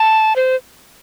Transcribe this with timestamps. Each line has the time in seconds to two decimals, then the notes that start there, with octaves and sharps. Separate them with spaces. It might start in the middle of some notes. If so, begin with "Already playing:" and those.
Already playing: A5
0.36 C5